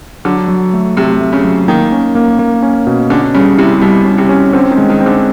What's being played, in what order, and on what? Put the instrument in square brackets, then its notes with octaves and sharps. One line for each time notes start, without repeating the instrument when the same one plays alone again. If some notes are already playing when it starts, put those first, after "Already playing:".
[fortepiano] D3 [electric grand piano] F#3
[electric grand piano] F#3
A3
[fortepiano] C3 [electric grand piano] A3
[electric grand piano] A3
[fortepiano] C#3
[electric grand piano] F#3
[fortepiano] D#3 [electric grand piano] A#3
[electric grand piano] C#4
A#3
A#3
C#4
B2
[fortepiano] D3 [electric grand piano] C#4
[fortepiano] C#3 [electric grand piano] G3
[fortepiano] C3 [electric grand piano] E4
[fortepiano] B2 [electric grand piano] G3
[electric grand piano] C#4
[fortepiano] C3
[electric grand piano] C#4
[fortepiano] D3 [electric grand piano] C4
[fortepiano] D#3
[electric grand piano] G#3
[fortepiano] D#3
[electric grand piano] C4
[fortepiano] D3